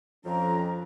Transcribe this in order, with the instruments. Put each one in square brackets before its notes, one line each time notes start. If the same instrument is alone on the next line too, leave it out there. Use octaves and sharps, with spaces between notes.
[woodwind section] F2 [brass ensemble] F3 C#4 [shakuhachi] A#5